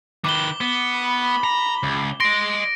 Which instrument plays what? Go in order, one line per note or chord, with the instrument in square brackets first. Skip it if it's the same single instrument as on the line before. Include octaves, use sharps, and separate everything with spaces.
[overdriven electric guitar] D#3 B4 [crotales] D6 G7
[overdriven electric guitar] B3
[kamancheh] B5
[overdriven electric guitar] A#5
C#2
[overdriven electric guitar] D#5 C6 [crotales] A#6 D7